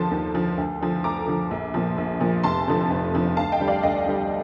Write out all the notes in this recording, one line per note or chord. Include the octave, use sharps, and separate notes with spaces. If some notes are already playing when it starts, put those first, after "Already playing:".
Already playing: D#2 D3 F3 A5 C6
D#2
D3 F3
D2
D3 F3
D2 A#5 D6
D3 F3
A#1
A#2 F3
A#1
A#2 F3
F1 A5 C6
F2 D3 F3
F1
F2 D3 F3
D2 F5 A5
D#5 G5
D3 G3
D5 F5
D2 D#5 G5
D3 G3